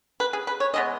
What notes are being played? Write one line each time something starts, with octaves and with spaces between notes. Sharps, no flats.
B4
G#4
B4
C#5
E3 G#3 B3 D#5